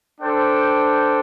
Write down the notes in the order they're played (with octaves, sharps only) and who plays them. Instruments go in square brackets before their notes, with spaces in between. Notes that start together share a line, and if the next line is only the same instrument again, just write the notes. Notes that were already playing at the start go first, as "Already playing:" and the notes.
[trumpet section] D4 A4 C5 G5